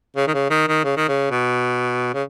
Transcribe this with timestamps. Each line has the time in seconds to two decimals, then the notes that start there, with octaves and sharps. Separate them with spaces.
0.16 C#3
0.28 D#3
0.34 C#3
0.50 D#3
0.68 D#3
0.84 C#3
0.97 D#3
1.08 C#3
1.31 B2
2.14 C#3